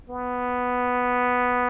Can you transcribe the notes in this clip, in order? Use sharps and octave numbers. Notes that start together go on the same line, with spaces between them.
B3